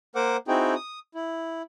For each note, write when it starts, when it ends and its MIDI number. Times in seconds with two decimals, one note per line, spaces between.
0.15 0.37 58
0.15 0.37 70
0.15 0.37 72
0.15 0.37 78
0.15 0.37 86
0.48 0.75 60
0.48 0.75 63
0.48 0.75 64
0.48 0.75 66
0.48 0.75 68
0.48 0.75 79
0.75 0.99 87
1.15 1.62 64